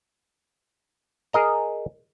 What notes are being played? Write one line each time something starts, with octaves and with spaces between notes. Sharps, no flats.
G#4 A#4 D#5 A#5